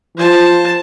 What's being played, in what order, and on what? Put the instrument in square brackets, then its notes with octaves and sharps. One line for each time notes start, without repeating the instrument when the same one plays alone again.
[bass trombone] F3 [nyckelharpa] C5 A5